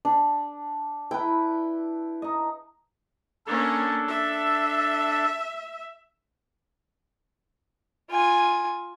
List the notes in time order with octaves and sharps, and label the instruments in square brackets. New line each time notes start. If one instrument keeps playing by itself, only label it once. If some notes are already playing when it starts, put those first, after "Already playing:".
[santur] D4
[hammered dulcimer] E4 B4 [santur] G5
[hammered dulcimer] D#4 D#5
[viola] A#3 C#4 [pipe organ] D4 A4
[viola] E5
[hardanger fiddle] F4 G#5